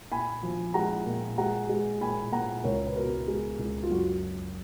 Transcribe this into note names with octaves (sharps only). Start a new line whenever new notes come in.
A#2 G#5 B5
F3
G#3 F#5 A#5
A#2
G#3 F#5 A#5
G#3
A#2 G#5 B5
A#2 F#5 A#5
C#2 A#4 C#5
B4
B2 F#4 A#4
G#3
C#2
F4
F#2 F#4